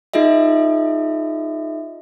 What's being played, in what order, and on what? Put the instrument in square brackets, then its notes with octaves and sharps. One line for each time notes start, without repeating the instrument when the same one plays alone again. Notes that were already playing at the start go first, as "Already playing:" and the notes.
[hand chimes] D#4 F4 G#4 D#5 E5